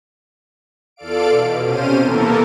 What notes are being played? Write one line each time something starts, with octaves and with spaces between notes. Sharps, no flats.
E2 F4 A4 D5 F5 D7
B2
C3 C#4 C5 F6 D#7
E3 A#3 B3 A4 A#4